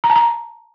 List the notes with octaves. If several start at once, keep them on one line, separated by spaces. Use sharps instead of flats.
A#5
A5
A#5